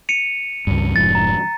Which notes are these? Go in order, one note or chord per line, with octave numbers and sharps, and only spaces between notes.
C#7 D#7 F7
C#2 G2
F1 G#2 F3 A6
A#5